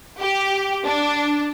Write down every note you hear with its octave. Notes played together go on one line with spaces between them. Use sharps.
G4
D4